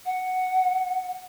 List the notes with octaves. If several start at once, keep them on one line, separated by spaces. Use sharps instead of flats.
F#5